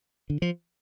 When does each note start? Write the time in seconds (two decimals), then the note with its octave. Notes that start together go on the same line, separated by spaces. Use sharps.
0.30 D3
0.42 F3